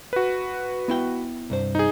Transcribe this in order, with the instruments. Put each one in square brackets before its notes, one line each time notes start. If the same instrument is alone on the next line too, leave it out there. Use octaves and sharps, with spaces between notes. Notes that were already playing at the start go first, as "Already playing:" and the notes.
[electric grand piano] F#4 B4
[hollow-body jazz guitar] B3 E4 G5
C2 G2 C5
[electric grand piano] D#4 G#4